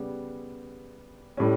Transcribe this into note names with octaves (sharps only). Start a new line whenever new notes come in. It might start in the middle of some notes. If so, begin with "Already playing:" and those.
Already playing: C#3 G3 B3
A2 G3 C#4